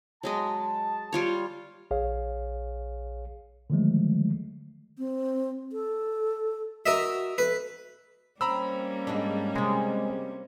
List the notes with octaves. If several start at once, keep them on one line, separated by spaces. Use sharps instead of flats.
F#3 G#3 D#5 A5
G3 F4 C#5
A#1 G#4 C#5 F5
D3 D#3 F3 F#3 G#3 A3
C4
A4
F#4 A#4 D#5 E5
A4 B4
G3 A#3 C4 C#4 A#5 B5 E6
G#2 G#3 D4
C3 G#3 C4